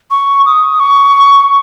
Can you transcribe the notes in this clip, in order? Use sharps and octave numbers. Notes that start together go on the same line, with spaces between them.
C#6
D#6
C#6